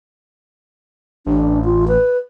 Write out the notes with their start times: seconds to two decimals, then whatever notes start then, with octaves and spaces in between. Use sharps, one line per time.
1.26 A1 D4
1.65 F4
1.88 B4